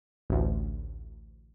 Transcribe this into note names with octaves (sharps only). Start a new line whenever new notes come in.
A1 D2